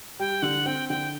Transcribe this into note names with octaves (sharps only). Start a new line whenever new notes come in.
G3 G5
D3 F#5
C4 G5
D3 G5